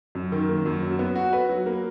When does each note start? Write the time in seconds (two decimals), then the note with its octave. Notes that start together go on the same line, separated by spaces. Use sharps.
0.15 F#2
0.32 D#3
0.49 A#3
0.66 F#2
0.82 F#3
0.99 B3
1.15 F#4
1.33 B4
1.49 F#3
1.66 A#3